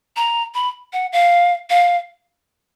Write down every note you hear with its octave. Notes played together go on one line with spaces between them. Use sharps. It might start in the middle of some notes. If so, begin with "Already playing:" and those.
A#5
B5
F#5
F5
F5